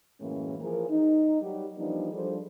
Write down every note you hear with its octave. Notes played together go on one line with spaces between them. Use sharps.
F#2 A2 E3 G#3 A#3 C#4
E3 F3 G#4 A#4
D#4
F#3 G3 G4
E3 F3 G3 A#3 D4 D#4
F3 G3 D4 G#4 A4 C5